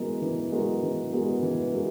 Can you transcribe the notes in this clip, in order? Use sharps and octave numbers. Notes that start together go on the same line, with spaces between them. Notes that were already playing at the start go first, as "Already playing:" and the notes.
Already playing: E3 G#3 B3 F#4 A#4
E3
G#3 B3 F#4 A#4
E3
G#3 B3 F#4 A#4
E3
G#3 B3 F#4 A#4